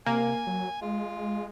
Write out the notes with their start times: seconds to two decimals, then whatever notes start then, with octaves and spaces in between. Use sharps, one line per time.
0.06 C3 A#3 G#5
0.47 F#3
0.81 G#3 F4